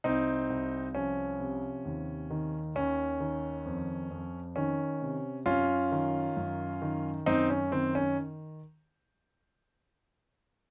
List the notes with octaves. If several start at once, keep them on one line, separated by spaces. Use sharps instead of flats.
C2 C4 D#4
C2
F3 C#4
C3
D#2
D#3
D#2 C#4
D#3
F2
F2
D#3 C#4
C3
F#2 C#4 F4
D#3
F#2
D#3
F#2 C4 D#4
C#4
D#3 C4
C#4